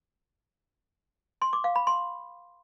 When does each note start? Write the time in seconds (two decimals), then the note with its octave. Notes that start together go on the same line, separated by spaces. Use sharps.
1.42 C6
1.53 D6
1.64 F5
1.76 B5
1.87 C6